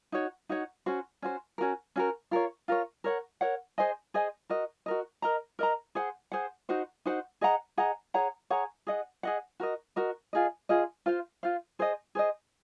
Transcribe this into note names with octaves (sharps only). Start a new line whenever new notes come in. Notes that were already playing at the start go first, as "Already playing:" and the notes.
D#4 F#4 C#5 F#5
D#4 F#4 C#5 F#5
C#4 F#4 C5
C#4 F#4 C5
C#4 F#4 A#4
C#4 F#4 A#4
F4 A#4 C#5
F4 A#4 C#5
A#4 C#5 F#5
A#4 C#5 F#5
G#4 C5 D#5 G#5
G#4 C5 D#5 G#5
F#4 A#4 D#5
F#4 A#4 D#5
A#4 D#5 A#5
A#4 D#5 A#5
G#4 C5 F#5
G#4 C5 F#5
D#4 F#4 C5 F#5
D#4 F#4 C5 F#5
G#4 D#5 F#5 A#5
G#4 D#5 F#5 A#5
G#4 C#5 F#5 A#5
G#4 C#5 F#5 A#5
G#4 D#5 F#5
G#4 D#5 F#5
F#4 A#4 D#5
F#4 A#4 D#5
F4 G#4 D#5
F4 G#4 D#5
F4 C5 F5
F4 C5 F5
G#4 C5 D#5
G#4 C5 D#5